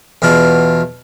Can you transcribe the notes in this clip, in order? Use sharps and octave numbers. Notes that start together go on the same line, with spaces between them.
E2 B2 F4